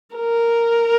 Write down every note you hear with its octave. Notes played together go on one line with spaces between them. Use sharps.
A#4